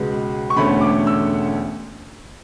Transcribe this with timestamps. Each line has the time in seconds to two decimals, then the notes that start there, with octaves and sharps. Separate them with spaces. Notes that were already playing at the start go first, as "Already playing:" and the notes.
Already playing: C#2 B2 G#3 B3
0.50 C#6
0.56 E1 D2 D3 A3 C#4 B5
0.81 D6
1.07 E6